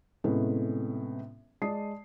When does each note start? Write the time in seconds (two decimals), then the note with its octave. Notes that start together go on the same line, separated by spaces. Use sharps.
0.24 A2 C3 G#3 B3 C#4
1.62 G#3 D5 A5 D#6 C7